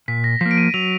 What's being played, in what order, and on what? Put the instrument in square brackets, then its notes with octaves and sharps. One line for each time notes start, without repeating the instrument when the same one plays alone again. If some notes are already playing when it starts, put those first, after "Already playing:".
[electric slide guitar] A#2 [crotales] B6
[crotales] A#6
[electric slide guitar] F3 A#3 [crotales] B6
[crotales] D7
D#7
[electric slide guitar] F#3 [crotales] F7